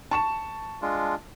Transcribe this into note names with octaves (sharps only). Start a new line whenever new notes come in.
A5 C#6 E7
G#3 D4 F4